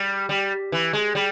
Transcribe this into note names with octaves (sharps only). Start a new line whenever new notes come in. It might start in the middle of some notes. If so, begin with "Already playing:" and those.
Already playing: G3
G3
E3
G#3
G3